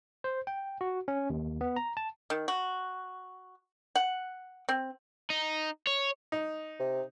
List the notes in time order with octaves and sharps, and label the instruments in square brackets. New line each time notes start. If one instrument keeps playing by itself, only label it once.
[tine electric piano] C5
G5
F#4
C#4
D#2
B3
A#5
A5
[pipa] D#3
F#4
F#5
C4
[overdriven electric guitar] D#4
C#5
[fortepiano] D#4
[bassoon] C3